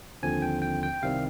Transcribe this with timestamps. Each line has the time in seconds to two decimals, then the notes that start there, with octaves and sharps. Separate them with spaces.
0.23 D#2 D3 F3 C4 G#5
0.42 G5
0.62 G5
0.83 G5
1.03 C2 C3 D#3 G3 C4 F5